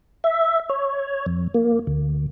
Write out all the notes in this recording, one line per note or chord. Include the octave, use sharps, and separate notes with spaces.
E5
C#5
F2
A#3
D2